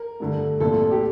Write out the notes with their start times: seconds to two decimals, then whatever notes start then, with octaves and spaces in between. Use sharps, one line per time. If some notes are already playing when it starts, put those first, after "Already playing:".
Already playing: A#4
0.20 G2 D3 A3
0.60 C2 A#2 A3 A4
0.91 G4